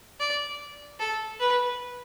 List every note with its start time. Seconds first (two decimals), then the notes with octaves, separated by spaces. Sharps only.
0.20 D5
1.00 A4
1.40 B4